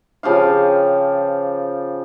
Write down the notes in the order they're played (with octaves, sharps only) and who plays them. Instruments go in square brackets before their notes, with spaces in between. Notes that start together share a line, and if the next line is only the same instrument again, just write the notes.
[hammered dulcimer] C#3 F3 G4 F5